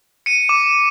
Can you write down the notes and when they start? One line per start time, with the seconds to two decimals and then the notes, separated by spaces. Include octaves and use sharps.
0.26 C#7 D#7
0.49 D6